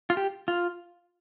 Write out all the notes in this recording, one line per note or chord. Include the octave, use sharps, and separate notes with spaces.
F4
G4
F4